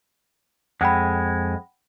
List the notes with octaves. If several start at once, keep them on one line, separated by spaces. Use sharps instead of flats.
F2 G#3 F#5 G5 B5